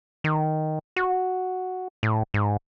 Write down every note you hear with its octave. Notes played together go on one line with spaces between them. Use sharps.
D#3
F#4
A2
G#2